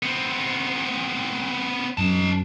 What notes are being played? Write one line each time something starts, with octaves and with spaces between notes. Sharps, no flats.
B3 C4
F#2 D#4 A5